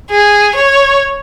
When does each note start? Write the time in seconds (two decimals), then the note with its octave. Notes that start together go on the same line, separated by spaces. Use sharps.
0.10 G#4
0.55 C#5